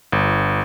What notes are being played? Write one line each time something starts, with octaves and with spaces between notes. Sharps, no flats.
G1